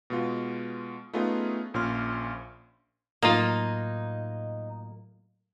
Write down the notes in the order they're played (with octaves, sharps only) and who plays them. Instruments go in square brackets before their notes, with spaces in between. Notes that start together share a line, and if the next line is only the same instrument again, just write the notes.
[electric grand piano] B2 G#3 F4
A3 B3 C#4 D#4 F4 G#4
A#1 A#2 C#4 C6 F6
[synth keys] A2 F#3 [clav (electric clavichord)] A#3 F4 [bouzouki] D#4